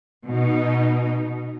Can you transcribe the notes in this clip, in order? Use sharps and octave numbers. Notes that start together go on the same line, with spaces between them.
B2 D#4